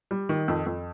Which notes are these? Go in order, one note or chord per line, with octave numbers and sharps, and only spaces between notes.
G3
D#3
F2
F2